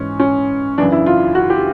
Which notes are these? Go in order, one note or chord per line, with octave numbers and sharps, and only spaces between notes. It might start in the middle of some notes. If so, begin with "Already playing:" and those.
Already playing: G#2 E3 C#4
C#4
F#2 C#3 E3 D4
E4
F4
F#4
G4